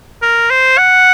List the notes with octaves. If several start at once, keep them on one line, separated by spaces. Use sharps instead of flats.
A#4
C5
F#5